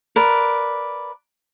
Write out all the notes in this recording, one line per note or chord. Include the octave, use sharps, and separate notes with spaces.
A#4 B4 D5